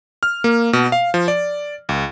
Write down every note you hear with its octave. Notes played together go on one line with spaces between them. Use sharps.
F6
A#3
B2
F5
F3
D5
C#2